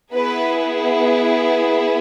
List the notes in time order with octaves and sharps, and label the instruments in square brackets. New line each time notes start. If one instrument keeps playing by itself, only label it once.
[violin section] B3 E4 G#4 B4